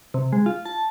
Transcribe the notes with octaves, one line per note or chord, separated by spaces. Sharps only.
C3
G#3
F4
A5